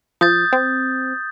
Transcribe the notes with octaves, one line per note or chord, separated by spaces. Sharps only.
F3 D#6 G6 A6
C4